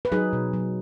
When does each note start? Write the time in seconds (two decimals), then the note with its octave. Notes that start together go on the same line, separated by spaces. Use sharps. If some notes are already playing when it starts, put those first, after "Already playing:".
0.05 B4
0.12 F#3 D#4 G#4
0.33 B2
0.53 F#3